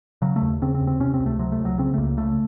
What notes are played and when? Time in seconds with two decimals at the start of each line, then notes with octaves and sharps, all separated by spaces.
0.22 C#3 F#3
0.36 A3
0.42 D#2
0.62 C#3 C4
0.75 C4
0.81 D#2
0.87 C4
1.00 C3 C#4
1.14 C4
1.20 C#2
1.26 A3
1.39 C3 F#3
1.52 A3
1.60 C#2
1.65 F#3
1.78 C#3 C4
1.94 A3
1.98 C#2 A#3
2.17 C#3 A3